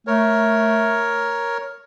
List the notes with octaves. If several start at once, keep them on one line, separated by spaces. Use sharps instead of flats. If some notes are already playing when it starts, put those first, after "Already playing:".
A3 A#4 C#5